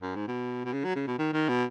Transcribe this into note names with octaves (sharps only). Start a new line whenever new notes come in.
F#2
G#2
B2
B2
C#3
F#3
C#3
B2
D#3
D#3
B2